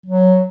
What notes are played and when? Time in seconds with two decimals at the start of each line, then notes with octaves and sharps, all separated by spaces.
0.06 F#3